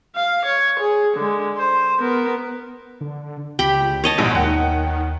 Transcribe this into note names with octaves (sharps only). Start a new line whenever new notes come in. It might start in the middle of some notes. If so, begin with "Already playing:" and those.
F5
C#5
G#4
D3 G#3
C5
B3 A#4
D3
C#2 G4 G5 B5
C#5 D#5 A5
A#1 G#2 B2 E3
D#2 D#3 F#5 G5